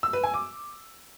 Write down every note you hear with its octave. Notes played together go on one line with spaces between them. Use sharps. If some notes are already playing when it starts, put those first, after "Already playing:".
E6
B4
G#5
D6